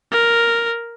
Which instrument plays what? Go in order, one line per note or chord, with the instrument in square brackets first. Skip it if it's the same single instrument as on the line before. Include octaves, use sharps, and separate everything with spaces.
[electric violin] A#4